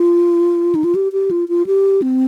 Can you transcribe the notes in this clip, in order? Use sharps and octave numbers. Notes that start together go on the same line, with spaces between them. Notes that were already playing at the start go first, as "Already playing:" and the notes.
Already playing: F4
D#4
F4
G4
G4
F4
F4
G4
C4